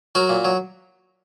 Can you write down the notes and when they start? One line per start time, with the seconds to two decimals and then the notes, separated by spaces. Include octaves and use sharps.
0.15 F#3 F#4 A#4
0.29 A#2
0.45 F#3